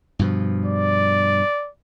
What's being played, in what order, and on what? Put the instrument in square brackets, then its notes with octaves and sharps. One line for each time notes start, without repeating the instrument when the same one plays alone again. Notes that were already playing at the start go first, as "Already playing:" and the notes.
[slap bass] G2 B2 F3
[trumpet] D5